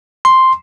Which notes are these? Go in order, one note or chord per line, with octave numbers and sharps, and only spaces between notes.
C6